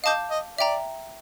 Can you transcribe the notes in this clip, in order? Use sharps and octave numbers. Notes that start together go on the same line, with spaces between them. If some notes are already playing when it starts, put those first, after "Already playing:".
D#5 F5 A5 D6 G6
D#5
D5 E5 G5 A#5